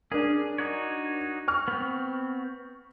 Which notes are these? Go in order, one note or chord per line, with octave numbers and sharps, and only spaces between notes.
C#4 D4 G#4 A#4
D#4 F#4 C#5
C#6 F6
B3 C4